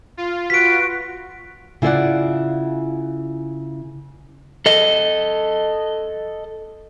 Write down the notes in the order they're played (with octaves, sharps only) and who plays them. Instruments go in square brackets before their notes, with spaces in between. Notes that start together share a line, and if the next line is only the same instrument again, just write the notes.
[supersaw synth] F4
[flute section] F#4 B4 [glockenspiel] B6 D7
[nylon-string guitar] C#3 E4 F4 B4 D5 F#5
[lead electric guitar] A4 D#5